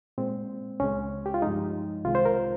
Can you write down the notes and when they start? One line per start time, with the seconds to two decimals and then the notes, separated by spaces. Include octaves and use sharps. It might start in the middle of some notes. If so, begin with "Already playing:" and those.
0.18 A#2 G#3 C4
0.80 C#2 C#3 G#3 C#4
1.26 G4
1.34 F4
1.42 G2 F3 G#3 D#4
2.05 C2 C3 D#3 G#3 F4
2.15 C5
2.25 A#4